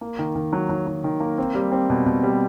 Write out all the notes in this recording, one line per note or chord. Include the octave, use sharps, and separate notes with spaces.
A#3
D#3
D#3
F#3
F#3
F#3
D#3
A#3
C4
G3
C4
B2
B2
G3